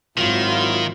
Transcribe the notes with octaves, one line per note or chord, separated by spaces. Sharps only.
G#1 D#3 F#3 E4 F4